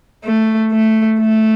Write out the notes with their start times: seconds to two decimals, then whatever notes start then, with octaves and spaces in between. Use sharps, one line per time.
0.24 A3
0.72 A3
1.20 A3